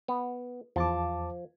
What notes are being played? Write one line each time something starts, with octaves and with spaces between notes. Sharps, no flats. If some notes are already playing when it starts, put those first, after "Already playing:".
B3
E2 F3 A5 D6